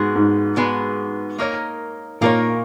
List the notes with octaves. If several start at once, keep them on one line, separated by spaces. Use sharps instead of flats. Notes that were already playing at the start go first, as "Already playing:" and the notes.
Already playing: G#2 G#3 B3 F#4
G#2
G#3 B3 F#4
A#3 D#4 A#4 C#5
A#2 A#3 D#4 A#4 C#5